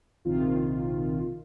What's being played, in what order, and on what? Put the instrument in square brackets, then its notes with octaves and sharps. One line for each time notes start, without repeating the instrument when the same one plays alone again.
[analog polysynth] A#1 C3 D#3 F4